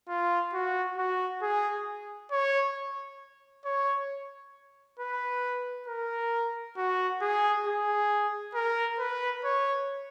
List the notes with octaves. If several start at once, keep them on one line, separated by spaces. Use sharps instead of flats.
F4
F#4
F#4
G#4
C#5
C#5
B4
A#4
F#4
G#4
G#4
A#4
B4
C#5